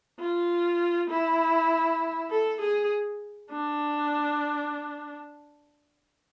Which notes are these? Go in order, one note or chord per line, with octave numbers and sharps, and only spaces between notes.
F4
E4
A4
G#4
D4